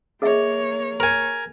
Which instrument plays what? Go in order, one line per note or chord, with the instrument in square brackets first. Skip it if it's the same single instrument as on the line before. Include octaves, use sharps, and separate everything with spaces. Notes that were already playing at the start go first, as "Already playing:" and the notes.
[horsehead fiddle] A#3 C#5 [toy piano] G#4 D#5 E5
[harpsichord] A#4 G#5